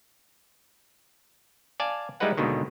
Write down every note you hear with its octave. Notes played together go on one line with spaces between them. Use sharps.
D5 F5 G#5 A5
G3 G#3 D#4 E4 B4 F#5
D#2 G#2 B2 D3 D#3